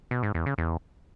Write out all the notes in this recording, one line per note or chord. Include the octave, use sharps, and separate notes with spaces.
B2
G#2
E2
C#3
E2